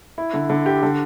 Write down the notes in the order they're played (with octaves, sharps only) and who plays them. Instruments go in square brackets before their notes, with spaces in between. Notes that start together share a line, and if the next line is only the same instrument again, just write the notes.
[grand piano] E4
D3
D3
G4
D3